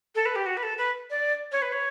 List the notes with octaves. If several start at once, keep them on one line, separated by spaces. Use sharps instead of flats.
A4
B4
G4
F#4
B4
A4
B4
D5
C#5
B4
C#5